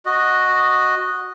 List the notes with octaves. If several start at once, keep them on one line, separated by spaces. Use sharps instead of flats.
F#4 D#5